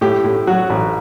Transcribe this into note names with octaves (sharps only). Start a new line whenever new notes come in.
A2 G4
A2
F#3 F#4
A1